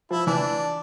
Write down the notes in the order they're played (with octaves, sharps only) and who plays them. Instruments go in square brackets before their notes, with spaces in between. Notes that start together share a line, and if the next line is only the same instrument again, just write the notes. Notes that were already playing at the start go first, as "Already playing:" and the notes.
[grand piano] F3 [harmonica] E4
[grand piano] E3 [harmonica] D4